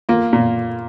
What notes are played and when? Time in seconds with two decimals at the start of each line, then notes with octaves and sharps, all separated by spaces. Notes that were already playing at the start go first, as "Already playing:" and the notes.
0.09 A#3 F4
0.33 A#2